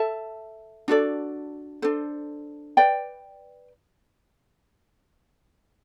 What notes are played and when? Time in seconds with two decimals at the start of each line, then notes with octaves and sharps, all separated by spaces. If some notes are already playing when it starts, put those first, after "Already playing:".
Already playing: A4 E5 A5
0.88 D4 F#4 A4 D5
1.82 D4 A4 C5
2.77 B4 D5 G5